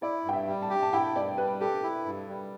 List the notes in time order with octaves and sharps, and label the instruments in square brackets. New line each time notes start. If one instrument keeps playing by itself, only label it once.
[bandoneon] E4 [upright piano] D5
[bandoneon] G2 [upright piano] G5
[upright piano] E5
[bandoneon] G3
[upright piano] A5
[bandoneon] G4
[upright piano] A5
[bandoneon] E4 [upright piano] G5
[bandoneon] G2 [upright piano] D5
[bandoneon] G3 [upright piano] B4
[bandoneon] G4 [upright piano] A4
[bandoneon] E4
G2
G3